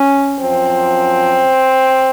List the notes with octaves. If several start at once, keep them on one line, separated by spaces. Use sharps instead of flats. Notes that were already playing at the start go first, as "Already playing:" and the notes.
Already playing: C#4
F#2 F3 C4